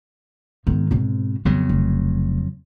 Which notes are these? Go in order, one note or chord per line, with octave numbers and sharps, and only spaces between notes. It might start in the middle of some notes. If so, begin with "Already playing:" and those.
G#2 D#3 B3
B2 C4
F2 C#3 F#3 B3
F1